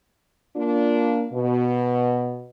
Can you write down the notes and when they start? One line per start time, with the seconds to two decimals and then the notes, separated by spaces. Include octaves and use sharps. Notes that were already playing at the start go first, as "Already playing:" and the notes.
0.56 A#3 D4 F4
1.32 B2